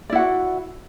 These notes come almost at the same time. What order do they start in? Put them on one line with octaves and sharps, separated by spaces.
D5 E4 F#5 F#4